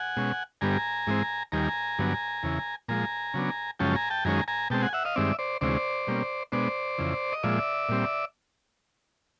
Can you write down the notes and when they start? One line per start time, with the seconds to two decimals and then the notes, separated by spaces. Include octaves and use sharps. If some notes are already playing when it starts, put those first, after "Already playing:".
Already playing: F#5 G#5
0.17 B2 G#3 C#4
0.61 G2 D3 G3 B3 G#5 A#5
1.07 G#2 E3 G#3 C4
1.52 D#2 D#3 G3 G#5 A#5
1.99 G2 D3 F#3 B3
2.43 E2 C#3 E3
2.88 A#2 F3 G#3 G#5 A#5
3.34 C#3 F#3 B3 D4
3.79 F#2 C#3 F3 G#3 C#4 G5 A5
3.95 G#5 A#5
4.10 G5 A5
4.25 F#2 D#3 G#3 C#4 G#5 A#5
4.48 G#5 A#5
4.70 B2 G#3 C4 G5 A5
4.82 F#5 G#5
4.93 E5 F#5
5.05 D#5 F5
5.16 G2 D#3 G#3 C4 D5 E5
5.39 C5 D5
5.61 D2 C3 E3 G#3 C#4 C5 D5
6.07 B2 G3 A#3 C#4
6.52 B2 G#3 B3 D4 C5 D5
6.98 F2 C#3 E3
7.32 D#5
7.43 A#2 F3 G#3 D5 E5
7.89 A#2 G3 C4